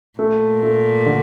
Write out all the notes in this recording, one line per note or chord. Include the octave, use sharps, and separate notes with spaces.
A#2 A3
A3
D3